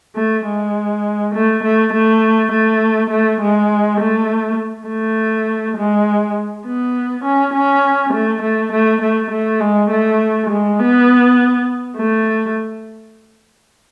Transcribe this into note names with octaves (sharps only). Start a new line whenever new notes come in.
A3
G#3
A3
A3
A3
A3
A3
G#3
A3
A3
G#3
B3
C#4
C#4
A3
A3
A3
A3
A3
G#3
A3
G#3
B3
A3